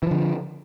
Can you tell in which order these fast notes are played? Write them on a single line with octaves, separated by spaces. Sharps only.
E3 F3 D3